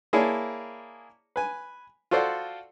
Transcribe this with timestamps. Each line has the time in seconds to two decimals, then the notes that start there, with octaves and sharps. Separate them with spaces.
0.13 A#3 E4 G#4 C#5 D5 A5
1.36 B4 G#5
2.11 F4 F#4 A4 C5 D5 F#5